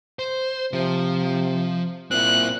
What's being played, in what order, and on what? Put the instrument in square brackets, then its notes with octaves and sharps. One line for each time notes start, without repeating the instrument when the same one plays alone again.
[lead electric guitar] C5
[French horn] C3 [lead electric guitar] F3
[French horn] A#2 [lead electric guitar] C4 E4 [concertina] F#6